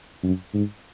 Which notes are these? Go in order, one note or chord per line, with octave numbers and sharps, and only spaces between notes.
F#2
G#2